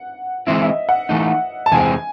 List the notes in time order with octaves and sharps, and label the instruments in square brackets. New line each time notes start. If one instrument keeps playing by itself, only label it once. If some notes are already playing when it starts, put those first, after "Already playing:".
Already playing: [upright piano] F#5
[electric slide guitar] E3 G#3 C4 E4 [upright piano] E5
[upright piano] E5
D#5
F#5
[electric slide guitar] E3 A3 D#4
[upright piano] A5
[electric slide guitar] E2 C3 E3 G#3 C4 [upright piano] G#5